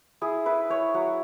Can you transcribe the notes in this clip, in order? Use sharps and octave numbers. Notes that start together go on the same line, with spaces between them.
E4 G#4
E4 B4
E4 C#5
F#3 F#5